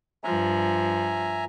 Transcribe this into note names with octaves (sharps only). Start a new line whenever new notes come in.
G2 F3 E5 G#5 A#5